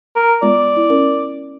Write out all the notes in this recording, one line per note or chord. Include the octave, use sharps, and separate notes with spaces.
A#4
G#3 B3 F4 D5
E4
C#4 A#4